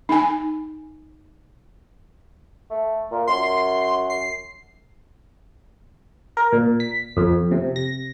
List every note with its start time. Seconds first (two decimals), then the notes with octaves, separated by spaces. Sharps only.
0.09 D#4 G#5
2.70 A3
3.11 A#2
3.27 F#2 C6
4.10 C7
6.37 A#4
6.53 A#2
6.80 B6
7.17 F2
7.51 C3
7.76 A#6